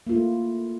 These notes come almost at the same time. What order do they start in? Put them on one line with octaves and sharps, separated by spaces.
A#3 F4 E4 A3